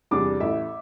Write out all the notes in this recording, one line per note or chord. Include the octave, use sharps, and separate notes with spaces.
E2 C3 G3 D4 D6
A1 A2 A3 E5